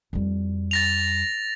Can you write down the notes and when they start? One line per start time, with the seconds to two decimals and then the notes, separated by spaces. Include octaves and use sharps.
0.13 F2 G3
0.71 A6 A#6 F7